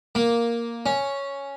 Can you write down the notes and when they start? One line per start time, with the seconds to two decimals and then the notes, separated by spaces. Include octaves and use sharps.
0.15 A#3
0.86 C#4